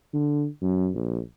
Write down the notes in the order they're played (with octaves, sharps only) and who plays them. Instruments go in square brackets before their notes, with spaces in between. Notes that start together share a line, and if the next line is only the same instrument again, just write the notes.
[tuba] D3
F#2
A#1